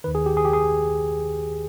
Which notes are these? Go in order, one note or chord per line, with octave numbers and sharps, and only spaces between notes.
D#2 D#3 B4
G#4
G4
G#4
G4
G#4